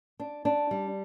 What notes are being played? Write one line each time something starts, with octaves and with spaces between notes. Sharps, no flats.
D4
D4
G3